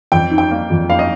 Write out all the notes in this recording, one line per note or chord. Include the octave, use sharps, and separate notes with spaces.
F2 G5
D#4
G5
A#3
F2
A#3 F5
D#5